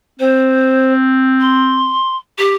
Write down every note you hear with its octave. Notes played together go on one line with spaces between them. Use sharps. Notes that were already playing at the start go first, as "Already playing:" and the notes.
C4 C5
C6
G4